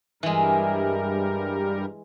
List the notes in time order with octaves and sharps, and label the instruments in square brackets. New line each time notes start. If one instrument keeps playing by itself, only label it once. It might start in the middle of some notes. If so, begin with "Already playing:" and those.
[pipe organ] G2 G3 A#4 [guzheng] E3 G#3